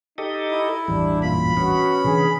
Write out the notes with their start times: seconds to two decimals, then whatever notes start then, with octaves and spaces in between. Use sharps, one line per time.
0.18 D#4 G4 A4 D#5
0.51 E4
0.88 A1 E2 G2 G3 D4
1.22 F#2 A#2 F4 B5
1.57 B3 C#4 F#4
2.04 C3 E3 D4 G#4